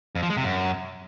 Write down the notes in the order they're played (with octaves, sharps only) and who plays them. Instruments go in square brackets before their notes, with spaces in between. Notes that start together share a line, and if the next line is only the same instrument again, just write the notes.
[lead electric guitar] F2
F3
G#3
C3
F#2